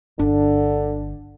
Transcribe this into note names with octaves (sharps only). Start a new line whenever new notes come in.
G1 D3 D4